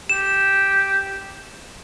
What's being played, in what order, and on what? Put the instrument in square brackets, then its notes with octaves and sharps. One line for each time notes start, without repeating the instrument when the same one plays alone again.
[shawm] G4 [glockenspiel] E7